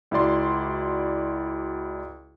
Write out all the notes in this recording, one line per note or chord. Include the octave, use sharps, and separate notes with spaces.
C#2 E4 F#4 D5 C6